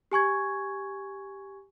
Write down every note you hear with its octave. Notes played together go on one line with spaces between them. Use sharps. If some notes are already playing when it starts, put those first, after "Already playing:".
G4 G#5 C#6 G#6